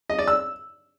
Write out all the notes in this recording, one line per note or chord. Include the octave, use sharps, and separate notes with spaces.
D#5
D5
E6